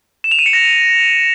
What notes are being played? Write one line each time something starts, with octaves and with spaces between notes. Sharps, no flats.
E7
F7
D#7
C#7
A#6